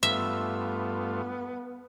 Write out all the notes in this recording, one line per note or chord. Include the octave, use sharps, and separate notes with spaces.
G2 A3 B3 F4 E5